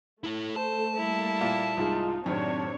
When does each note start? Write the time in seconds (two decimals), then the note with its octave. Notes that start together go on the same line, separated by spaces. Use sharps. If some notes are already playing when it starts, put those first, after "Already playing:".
0.24 A3 E4 A4
0.56 C5 A5
0.97 G3 A#3 E4
1.40 A#2 F4 G4
1.77 C2 G#2 G#3 D#4 F4
2.26 F#2 A2 C3 D#3 C4 D4 C#5